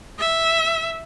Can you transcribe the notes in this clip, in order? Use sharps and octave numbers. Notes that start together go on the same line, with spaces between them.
E5